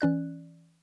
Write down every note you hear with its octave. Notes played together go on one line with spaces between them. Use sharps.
E3 C#4 D5 F#6